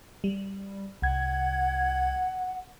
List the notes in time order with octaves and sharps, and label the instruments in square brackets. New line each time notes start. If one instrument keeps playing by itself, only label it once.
[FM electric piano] G3
[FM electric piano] C2 G#6 [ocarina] F#5